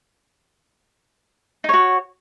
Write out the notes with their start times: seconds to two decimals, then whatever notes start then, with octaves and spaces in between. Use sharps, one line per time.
1.64 D#4
1.69 C#5
1.73 F#4